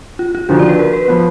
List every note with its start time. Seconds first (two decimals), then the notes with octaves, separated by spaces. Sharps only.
0.19 F4
0.35 F4
0.49 D#2 D3 F3 F#4
0.59 D5
0.69 B4
0.79 A#4
0.93 B4
1.08 F3 B3